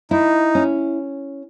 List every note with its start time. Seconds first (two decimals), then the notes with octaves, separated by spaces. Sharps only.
0.11 D#4 E4
0.55 C#4